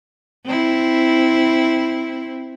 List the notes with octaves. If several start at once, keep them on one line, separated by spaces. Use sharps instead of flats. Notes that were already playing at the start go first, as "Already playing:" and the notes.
C4 E4